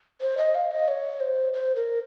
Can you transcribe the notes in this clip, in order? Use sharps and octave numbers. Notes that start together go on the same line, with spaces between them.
C5
D#5
F5
D#5
C#5
C5
C5
A#4